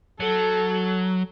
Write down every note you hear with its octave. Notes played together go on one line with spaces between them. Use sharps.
F#3 A4